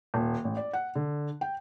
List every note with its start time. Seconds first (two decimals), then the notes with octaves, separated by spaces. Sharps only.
0.14 D#1
0.45 A1
0.57 D5
0.73 F#5
0.95 D3
1.41 G5